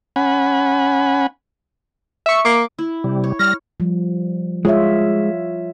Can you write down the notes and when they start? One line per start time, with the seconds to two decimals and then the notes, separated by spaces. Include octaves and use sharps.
0.16 C#4 F#5 G#5 B5
2.26 E5 C#6
2.45 A#3 D6
2.79 E4
3.04 C3 G3
3.24 C#5
3.39 G3 F6 A#6
3.80 F3 G3
4.65 G#3 F4 C#5 E5